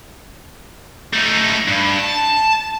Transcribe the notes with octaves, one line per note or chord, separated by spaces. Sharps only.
A3 D#4
G2
A5